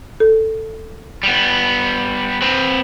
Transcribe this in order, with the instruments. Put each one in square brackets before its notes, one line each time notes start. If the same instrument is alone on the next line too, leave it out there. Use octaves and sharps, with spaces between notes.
[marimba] A4
[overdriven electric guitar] G3 B3
C4 B4